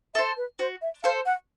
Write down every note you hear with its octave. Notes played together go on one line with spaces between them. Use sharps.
A4 C5 E5
B4
F#4 C5
E5
A4 C5 F5
F#5